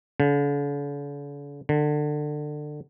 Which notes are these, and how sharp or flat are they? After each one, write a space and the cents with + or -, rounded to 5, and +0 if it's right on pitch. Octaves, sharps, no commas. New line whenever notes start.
D3 -45
D3 +25